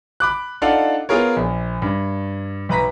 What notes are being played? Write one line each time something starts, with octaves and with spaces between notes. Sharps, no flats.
B5 D6 F#6
D4 D#4 F4 A4 F5 F#5
B3 F4 G#4 A#4 C#5
A#1
G2
B1 B4 A#5 B6